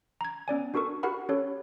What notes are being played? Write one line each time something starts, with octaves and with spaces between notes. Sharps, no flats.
A#5 G#6
B3 C#4 D5 G#5
D4 F#4 A4 A#4 C#6
F#4 G4 A#4 F#5 B5
C#4 G4 A4 C#5